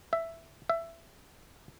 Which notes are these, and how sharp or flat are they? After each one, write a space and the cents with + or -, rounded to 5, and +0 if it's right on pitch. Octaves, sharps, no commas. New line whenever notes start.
E5 +5
E5 +15